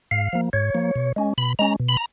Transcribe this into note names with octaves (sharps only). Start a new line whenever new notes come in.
G#2 F5
F3 A#3
G#2 C#5
F3 A#3
B2
G#3 C#4
B2 B5
G#3 C#4 A#5
B2
B5
A#5